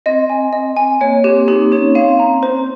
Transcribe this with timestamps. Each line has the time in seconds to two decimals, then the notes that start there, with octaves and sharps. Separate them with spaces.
0.06 C4 D#5
0.30 G#5
0.53 D#5
0.77 G#5
1.01 A#3 C#5
1.24 C4 G4
1.48 D#4 G4
1.72 C#4 C#5
1.95 C4 F5
2.19 C4 A#5
2.43 C5